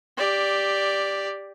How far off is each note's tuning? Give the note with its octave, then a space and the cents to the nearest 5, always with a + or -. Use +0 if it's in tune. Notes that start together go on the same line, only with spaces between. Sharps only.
G4 +10 D5 +0